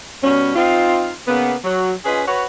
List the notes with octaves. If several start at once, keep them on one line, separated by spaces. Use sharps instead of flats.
B2 G3 C#4
C4 D#4 F4
C#3 A#3 B3
F#3
C#4 F4 G#4 B4 D#5
F#4 B4 C#5